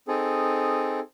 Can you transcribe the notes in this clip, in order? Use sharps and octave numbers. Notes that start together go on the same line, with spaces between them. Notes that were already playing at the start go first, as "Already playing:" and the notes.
C4 D#4 G#4 A4